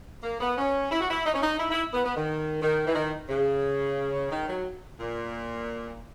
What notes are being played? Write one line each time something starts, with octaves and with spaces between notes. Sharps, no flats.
A#3
B3
C#4
E4
F#4
E4
D#4
C#4
D#4
E4
E4
B3
B3
D#3
D#3
E3
D#3
C#3
D#3
F#3
A#2